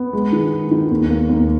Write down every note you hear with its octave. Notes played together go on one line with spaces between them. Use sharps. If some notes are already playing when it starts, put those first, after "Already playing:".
Already playing: B3
G#3
D#3
G#3
D#3
D#2
A#3
D#2